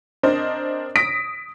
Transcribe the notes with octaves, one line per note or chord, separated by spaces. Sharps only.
C4 D4 A#4 C5 D#5
D#6 A#6 B6 D7